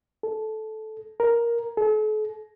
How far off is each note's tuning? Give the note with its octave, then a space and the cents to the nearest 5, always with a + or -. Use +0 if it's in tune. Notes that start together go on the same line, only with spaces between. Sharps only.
A4 -15
A#4 +5
A4 -45